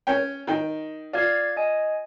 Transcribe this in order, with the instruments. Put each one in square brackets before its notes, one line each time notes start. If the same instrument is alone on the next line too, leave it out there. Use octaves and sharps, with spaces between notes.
[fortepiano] C#4 C#5 G5
D#3 G5
[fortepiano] F4 [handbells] D5 F5 G#6
[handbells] D#5 G#5